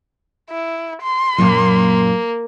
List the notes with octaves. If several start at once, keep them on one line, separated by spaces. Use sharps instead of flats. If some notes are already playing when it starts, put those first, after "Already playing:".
E4
C6
F#2 A#2 F#3 A#3